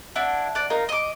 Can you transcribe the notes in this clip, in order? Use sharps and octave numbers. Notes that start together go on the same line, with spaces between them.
D4 E4 F#5
D5 F#5
D#4 F4 A#4
D#5 D6